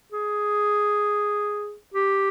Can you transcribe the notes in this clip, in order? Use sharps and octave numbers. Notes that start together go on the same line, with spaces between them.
G#4
G4